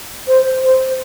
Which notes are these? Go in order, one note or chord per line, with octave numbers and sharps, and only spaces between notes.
C5
C5